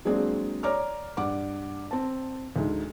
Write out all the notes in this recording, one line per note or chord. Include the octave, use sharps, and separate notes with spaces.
F#3 G#3 A#3 C4 D4 G#4
C#5 D5 A#5 D6 F6
G2 F#5 D6
C4 A5
D2 G#2